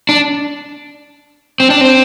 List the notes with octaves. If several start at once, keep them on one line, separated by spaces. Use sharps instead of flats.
D4
C4
D4
C4